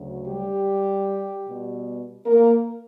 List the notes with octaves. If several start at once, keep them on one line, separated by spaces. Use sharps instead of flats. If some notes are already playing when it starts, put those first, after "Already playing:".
Already playing: D2 C#3 F#3
G3 G4
B2 G3 B3
A#3 A#4